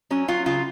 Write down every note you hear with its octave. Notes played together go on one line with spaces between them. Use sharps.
F#3 C#4
F#3 F4
C#3 F4